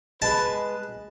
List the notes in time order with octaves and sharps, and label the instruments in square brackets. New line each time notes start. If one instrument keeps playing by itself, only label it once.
[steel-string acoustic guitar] G#3 [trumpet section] B4 [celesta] D#5 [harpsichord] A5